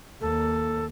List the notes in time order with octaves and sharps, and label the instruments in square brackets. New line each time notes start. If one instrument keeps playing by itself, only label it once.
[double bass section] D#2 A#3 [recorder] A4